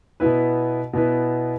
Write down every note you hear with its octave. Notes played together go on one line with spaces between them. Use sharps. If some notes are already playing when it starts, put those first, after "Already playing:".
B2 B3 E4 B4
B2 B3 E4 B4